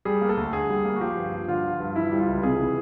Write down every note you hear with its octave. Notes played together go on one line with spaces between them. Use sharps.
G3 G#4
A#3
A4
D2
D3 G#4
G3
A#3
F#4
F3 G4
G2
G2
D3 F4
F3
G2
E3 E4
G3
F4
C#2
C3 G#4
E3